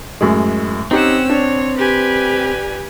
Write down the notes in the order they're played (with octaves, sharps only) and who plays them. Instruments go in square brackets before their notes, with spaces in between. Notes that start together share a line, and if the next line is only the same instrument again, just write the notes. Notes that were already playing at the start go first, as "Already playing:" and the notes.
[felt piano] F#2 A2 G#3
[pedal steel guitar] C4 [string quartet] C#4 F#5 E6 [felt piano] D#4 G4
[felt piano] D4 [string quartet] C#5
[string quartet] G4 B4 G#5